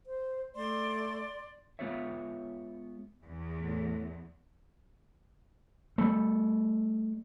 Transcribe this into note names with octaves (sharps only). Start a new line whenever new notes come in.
C5
A3 D5 C6
G#3 B3 F4 G4 C#5 E5
E2
A2
G3 A3